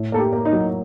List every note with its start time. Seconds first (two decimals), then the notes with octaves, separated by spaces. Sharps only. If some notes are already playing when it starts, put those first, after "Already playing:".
Already playing: A2
0.12 A#3 A4
0.19 G4
0.33 A#3
0.45 D#4
0.53 F#3